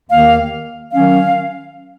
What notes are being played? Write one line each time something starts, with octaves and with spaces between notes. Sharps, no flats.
D#2 D#3 A#3 F5
D#3 F#3 C#4 F5